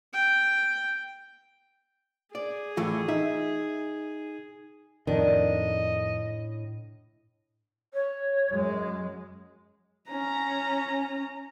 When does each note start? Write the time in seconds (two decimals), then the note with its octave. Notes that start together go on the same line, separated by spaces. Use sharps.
0.13 G5
2.35 G#4 D5
2.77 A2 E3 A3 F4
3.08 D#4 E5
5.07 F2 A2 D#3 D4 D#5
7.93 C#5
8.51 F#2 G#3
10.10 C#4 A#5